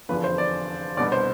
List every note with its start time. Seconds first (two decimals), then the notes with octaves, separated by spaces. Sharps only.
0.09 F1 E2 D3 F3 B3 B4
0.24 C5
0.38 D5
0.97 C2 B2 B3 D4 D5
1.12 C5